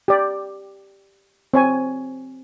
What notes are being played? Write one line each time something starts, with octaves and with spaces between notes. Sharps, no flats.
G4 D5
C4 C#5 G#5